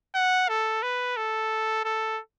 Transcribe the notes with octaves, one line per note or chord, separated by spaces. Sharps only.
F#5
A4
B4
A4
A4